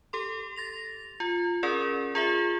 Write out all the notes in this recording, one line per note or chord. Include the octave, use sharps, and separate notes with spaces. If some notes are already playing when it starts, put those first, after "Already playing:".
G4 A4 C6
A6 A#6 F7
F4
C#4 G#4 A#4 D5
F4 G#4 E5